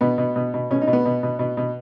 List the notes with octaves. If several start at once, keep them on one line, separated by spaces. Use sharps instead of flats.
B2 B3
B2
B2
B2
B2 C#4
D#4
B2
B3
B2
B2
B2
B2